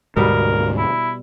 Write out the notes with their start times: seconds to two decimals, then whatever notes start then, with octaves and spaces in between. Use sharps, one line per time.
0.16 D2 G#2 B2 G3 G#3 A#4
0.78 E4